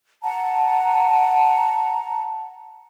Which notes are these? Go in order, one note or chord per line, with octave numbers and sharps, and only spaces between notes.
F#5 A5 A#5